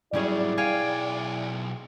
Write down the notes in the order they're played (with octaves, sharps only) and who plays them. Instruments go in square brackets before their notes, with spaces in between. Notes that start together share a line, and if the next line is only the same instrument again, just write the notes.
[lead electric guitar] G#2 F#3 [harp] G3 C#4 G#4 [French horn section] E4 [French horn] D5
[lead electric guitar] B1 G5 [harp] C#5 F5 G#5